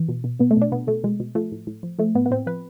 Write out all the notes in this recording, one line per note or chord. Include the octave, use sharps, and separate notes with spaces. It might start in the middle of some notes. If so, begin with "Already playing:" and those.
Already playing: E3
B2
B2
B2 B3
A3
B2 D4
B2 B3
B2 A3
B2 G#3
B2
F3 A3
A2
A2
F3
F3 A3
A2 B3
B3
A2 C4
F3 B4